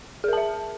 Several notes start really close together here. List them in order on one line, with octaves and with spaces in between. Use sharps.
G#4 A#4 A5 E5